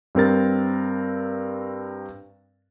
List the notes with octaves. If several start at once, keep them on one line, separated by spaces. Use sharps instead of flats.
G2 C4 A#4 A6